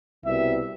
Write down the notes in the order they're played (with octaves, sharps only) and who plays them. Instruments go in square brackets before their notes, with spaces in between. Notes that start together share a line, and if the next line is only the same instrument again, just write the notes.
[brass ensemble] C2 B2 G3 E5